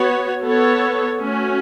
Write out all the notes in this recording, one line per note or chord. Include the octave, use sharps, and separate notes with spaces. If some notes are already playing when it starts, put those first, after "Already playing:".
Already playing: B3 F#4 C#5
B3 A4 C#5
A3 C#4 F#4